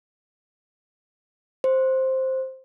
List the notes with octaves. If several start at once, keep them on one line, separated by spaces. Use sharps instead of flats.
C5